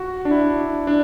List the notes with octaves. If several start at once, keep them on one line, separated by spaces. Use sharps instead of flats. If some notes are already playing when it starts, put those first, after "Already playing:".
Already playing: F#4
D4
E4
D4